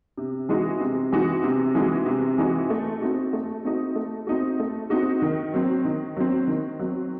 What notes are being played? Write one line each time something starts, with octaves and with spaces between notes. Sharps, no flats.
C3
E3 G#3 D#4 F#4
C3
E3 G#3 D#4 F#4
C3
E3 G#3 D#4 F#4
C3
E3 G#3 D#4 F#4
A3
C4 D#4 F#4
A3
C4 D#4 F#4
A3
C4 D#4 F#4
A3
C4 D#4 F#4
D#3
F#3 C4
D#3
F#3 C4
D#3
F#3 C4